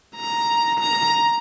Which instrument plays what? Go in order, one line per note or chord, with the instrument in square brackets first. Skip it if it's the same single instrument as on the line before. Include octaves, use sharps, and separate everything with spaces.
[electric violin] A#5
A#5